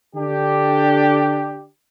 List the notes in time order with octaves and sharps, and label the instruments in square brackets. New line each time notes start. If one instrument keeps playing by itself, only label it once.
[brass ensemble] D3 D4 G4